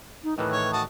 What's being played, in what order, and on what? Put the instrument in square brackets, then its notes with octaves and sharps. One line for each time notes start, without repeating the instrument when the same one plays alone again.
[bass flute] D#4
[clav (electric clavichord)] A2 D#3 E3 [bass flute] B4
[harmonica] C#5
F#4 A5 D#6